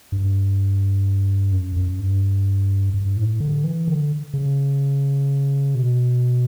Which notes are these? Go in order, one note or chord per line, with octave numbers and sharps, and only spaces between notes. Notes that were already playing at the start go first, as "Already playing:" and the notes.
G2
F#2
F#2
G2
G2
A2
D3
E3
D3
C#3
B2